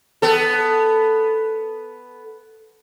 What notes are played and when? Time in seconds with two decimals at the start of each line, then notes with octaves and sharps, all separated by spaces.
0.22 B3 A4